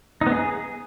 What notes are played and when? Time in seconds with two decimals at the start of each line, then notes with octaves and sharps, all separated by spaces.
0.21 D#4
0.27 B3
0.32 G#4